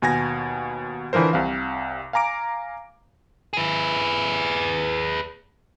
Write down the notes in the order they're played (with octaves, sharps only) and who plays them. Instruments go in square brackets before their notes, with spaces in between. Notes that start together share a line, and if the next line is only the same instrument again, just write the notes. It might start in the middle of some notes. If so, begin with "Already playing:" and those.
[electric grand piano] D#2 B2 G#5 G#6 A#6
D3 E3 F3 A#4 C5
C2 C3 F5
F5 G#5 A#5 D6 D7
[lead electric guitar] G#4 B4